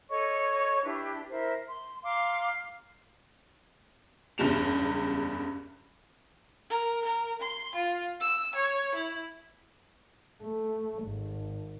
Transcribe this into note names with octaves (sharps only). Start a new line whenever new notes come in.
A4 C#5 D#5 C#6
D4 E4 G4 B4
E4 A#4 C5 E5
C6
F5 A#5 C6 D6
F#1 E2 G2 G3 E7 F7
A#4
A#4
C6
F4
E6
C#5
E4
A3
G#1